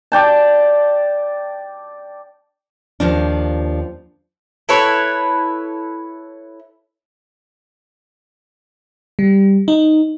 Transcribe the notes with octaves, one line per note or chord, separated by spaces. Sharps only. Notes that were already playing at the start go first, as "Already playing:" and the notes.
D5 G5 A5
D#2 F3 D4
E4 A4 B4 C#5
G3
D#4